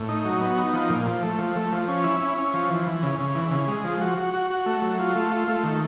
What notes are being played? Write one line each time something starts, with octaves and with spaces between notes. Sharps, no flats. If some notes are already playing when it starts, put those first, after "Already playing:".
Already playing: A2
D#4
F#3
B3
D#4
F3
A#2
F3
A3
F3
A3
F3
C#4
E4
C#4
C#4
F3
E3
E3
C#3
C#3
E3
C#3
G#3
F3
F#4
F#4
F#4
F#4
A3
F#3
F4
A3
F4
A3
D#3